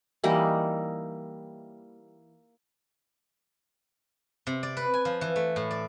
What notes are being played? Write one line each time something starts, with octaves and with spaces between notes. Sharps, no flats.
E3 G3 A#3 D#4
C3
D5
B4
G#5
F3
E3
A3
A2
D5